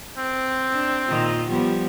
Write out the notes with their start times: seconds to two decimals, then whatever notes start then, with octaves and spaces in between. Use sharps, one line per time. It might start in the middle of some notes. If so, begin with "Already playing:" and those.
0.17 C4
0.72 D4
1.08 A#2 D#3 F4
1.50 F3 G3 B3